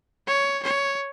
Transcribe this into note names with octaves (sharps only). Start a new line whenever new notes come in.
C#5
C#5